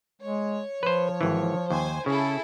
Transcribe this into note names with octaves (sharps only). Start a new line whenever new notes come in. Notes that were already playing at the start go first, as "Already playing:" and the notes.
G#3 C#5
F3 B4 C5
G#1 E3
D#2 C5 G#5
C#3 E4 G#4 A4